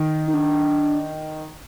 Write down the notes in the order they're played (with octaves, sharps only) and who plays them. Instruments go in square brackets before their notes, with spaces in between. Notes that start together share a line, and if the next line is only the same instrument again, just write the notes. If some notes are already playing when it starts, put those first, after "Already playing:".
Already playing: [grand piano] D#3
[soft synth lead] D#4
D4